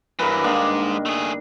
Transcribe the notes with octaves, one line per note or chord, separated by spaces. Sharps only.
G2 E3 F#3 A#4 B4
G#2 D#3 G#3 A#3 D4
A3 G#4